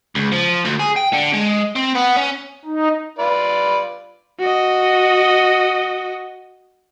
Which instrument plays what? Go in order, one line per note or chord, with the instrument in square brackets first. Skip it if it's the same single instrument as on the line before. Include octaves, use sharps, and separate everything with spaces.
[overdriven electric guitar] C#2
F3
D2
G#4
G5
D3
G#3
C4
B3
C#4
[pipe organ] D#4
[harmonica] F4 B4 D5
[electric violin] F#4 D#5